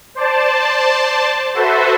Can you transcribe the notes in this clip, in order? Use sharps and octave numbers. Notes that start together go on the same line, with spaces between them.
C5 D5 A5
F#4 A4 B4 C5 E5